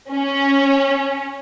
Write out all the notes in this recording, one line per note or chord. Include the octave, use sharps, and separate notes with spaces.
C#4